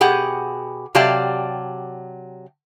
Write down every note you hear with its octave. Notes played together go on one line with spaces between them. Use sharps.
B2 G4 G#4 F#5
C3 F#3 G4 D5 F5 A5